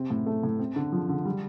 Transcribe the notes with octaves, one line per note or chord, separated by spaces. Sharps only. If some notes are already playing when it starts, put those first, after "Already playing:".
Already playing: C3 C4
A2
A3
A2
C4
D3
F3
D3
G3